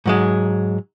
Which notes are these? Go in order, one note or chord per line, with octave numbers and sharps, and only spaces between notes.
G#2 F#3 G#3